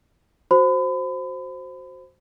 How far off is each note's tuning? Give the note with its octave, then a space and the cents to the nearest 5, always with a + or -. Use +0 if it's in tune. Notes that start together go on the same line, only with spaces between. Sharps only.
F#4 +0 C5 +0 B5 +35